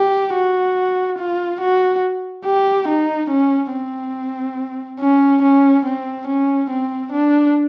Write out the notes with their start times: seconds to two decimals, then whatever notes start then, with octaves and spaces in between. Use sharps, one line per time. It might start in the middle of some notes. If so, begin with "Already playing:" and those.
Already playing: G4
0.34 F#4
1.19 F4
1.61 F#4
2.45 G4
2.88 D#4
3.30 C#4
3.73 C4
5.00 C#4
5.42 C#4
5.85 C4
6.27 C#4
6.70 C4
7.12 D4